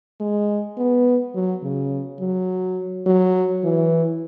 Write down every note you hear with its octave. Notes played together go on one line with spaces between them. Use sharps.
G#3
B3
F#3
C#3
F#3
F#3
E3